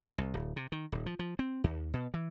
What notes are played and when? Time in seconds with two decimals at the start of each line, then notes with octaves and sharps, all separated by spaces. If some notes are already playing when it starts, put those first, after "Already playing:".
0.18 C2
0.34 D1
0.56 C3
0.72 D#3
0.92 D#1
1.06 F3
1.19 F3
1.39 C4
1.64 D#2
1.94 B2
2.14 E3